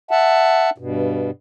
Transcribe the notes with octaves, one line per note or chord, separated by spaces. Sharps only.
E5 F#5 A5
G2 B2